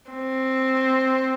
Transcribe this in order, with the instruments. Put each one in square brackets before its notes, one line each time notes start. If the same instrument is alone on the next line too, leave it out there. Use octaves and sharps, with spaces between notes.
[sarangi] C4